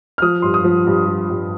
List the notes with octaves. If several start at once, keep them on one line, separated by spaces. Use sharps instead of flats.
F6
F3 D#6
G2 C6
D#6
F3
G2
F3
G2